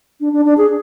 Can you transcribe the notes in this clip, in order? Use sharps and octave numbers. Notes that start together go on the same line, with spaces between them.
D4
D4
D4
G#4